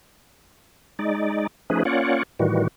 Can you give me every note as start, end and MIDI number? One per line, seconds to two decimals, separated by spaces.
0.99 1.47 56
0.99 1.47 63
0.99 1.47 74
1.70 1.83 53
1.70 1.83 57
1.70 1.83 61
1.70 1.83 63
1.70 1.83 68
1.70 1.83 71
1.85 2.23 58
1.85 2.23 61
1.85 2.23 65
1.85 2.23 73
1.85 2.23 74
1.85 2.23 78
2.39 2.68 45
2.39 2.68 51
2.39 2.68 52
2.39 2.68 55
2.39 2.68 66